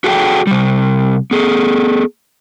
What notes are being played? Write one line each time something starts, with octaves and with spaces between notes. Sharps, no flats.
F#4 G#4 A4 D5 F5 G5
C3 G3
B3 G#4 A4